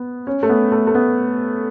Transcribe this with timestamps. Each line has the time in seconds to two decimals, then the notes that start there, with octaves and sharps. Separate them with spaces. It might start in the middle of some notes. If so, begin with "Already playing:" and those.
Already playing: B3
0.27 C#4
0.43 A3
0.49 B3
0.72 A3
0.87 A3
0.95 B3